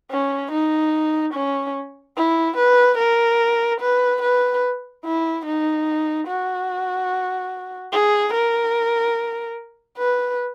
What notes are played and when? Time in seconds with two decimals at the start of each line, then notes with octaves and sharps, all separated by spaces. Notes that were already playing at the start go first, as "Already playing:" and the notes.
0.11 C#4
0.52 D#4
1.34 C#4
2.17 E4
2.57 B4
2.98 A#4
3.81 B4
4.22 B4
5.05 E4
5.46 D#4
6.27 F#4
7.93 G#4
8.34 A#4
9.98 B4